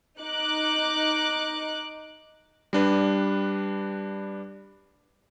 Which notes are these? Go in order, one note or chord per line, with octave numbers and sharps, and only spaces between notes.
D#4 D6 F#6
G3 D4 B4